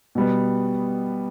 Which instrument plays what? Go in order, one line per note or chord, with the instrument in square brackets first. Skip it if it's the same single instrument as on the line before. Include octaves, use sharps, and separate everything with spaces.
[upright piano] B2 G3 B3